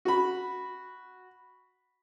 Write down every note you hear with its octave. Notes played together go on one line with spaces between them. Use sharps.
F#4 B5